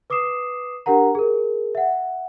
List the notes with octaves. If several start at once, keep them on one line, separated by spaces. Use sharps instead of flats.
B4 D6 D#6 C7 E7
D4 G4 A#4 F#5 A#5
G#4 A#4
E5 F#5